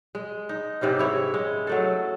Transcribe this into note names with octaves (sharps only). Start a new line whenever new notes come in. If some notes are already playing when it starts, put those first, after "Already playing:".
G#3
D#4
G#2 C3 E3 C#4
E4 C#5
G#3
F#3 A3 A4